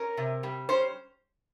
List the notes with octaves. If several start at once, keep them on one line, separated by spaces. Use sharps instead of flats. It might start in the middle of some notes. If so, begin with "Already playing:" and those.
Already playing: C#4 A#4
C3
G3
C#4 C5